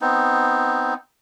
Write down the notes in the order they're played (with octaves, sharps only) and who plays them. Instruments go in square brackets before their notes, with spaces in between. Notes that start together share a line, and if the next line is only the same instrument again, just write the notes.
[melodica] B3 C4 D#4